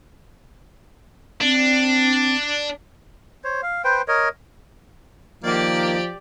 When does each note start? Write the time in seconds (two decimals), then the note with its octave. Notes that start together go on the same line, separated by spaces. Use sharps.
1.41 C4 D4
3.44 C5 C#5
3.63 F5
3.84 B4 C5 G5
4.08 A#4 C#5 D#5
5.44 D#3 F3 A#3 G4 D5